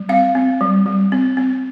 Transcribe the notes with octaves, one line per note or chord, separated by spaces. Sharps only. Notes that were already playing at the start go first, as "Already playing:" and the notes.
Already playing: G3
C4 F5
C4
G3
G3
C4
C4